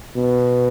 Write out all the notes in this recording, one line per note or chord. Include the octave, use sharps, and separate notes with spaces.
B2